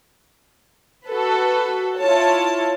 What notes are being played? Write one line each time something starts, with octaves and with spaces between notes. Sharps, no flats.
F#4 A4 B4
E4 F4 C#5 A5